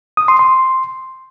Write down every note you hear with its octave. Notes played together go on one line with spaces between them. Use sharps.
D#6
C6
C6